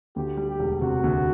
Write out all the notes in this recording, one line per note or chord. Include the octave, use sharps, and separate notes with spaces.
D2 G4
G3
G4
E1
C3 F#4
D2